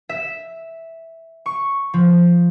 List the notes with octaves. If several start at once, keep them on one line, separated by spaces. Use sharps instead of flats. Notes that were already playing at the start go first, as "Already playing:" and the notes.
E5
C#6
F3